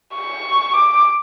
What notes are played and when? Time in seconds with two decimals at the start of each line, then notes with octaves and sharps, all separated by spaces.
0.15 C#6
0.73 D6